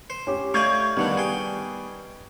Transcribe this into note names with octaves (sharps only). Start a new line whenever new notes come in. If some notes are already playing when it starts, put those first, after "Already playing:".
C5
C#4 G4
A3 D5 D#5 F5 C#6 G6 G#6
D#2 D3 G3 B3 D4 D#4
G#4 G5